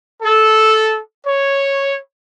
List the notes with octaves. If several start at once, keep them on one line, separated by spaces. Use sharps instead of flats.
A4
C#5